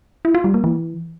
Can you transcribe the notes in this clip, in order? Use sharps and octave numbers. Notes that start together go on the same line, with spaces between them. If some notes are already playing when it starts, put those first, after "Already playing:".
E4
F4
G3
A#3
E3